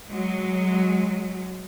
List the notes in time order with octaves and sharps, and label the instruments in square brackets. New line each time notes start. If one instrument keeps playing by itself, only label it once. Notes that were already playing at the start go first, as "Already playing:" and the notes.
[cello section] F#3 G#3